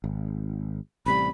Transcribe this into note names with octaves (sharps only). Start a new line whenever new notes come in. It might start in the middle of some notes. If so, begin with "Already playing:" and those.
G#1
A1 C3 G3 B5